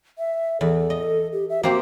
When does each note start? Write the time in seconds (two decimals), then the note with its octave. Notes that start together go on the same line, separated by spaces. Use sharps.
0.18 E5
0.61 E2 A4
0.90 D#5
1.33 G4
1.50 E5
1.63 A#3 C4 F#4 G4